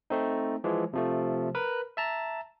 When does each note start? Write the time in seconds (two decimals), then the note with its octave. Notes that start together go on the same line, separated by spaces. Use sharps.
0.10 A3 C4 D#4
0.64 E3 F3 G#3
0.93 C3 F3 A3
1.55 A#4 B4
1.97 E5 A5 A#5